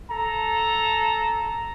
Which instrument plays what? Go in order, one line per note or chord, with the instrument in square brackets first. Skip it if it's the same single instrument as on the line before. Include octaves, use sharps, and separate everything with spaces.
[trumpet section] A4 A#5